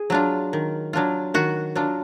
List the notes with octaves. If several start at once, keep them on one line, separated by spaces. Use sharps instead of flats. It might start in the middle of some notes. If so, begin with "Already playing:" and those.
Already playing: G#4
F#3 D4 F4
D#3
F#3 D4 F4
D#3 F#4
F#3 D4 F4